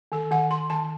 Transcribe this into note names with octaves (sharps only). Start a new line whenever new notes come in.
D#3 A4
D#3 F#5
D#3 C6
D#3 A5